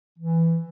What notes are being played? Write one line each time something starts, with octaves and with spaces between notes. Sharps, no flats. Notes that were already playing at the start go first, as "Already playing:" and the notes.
E3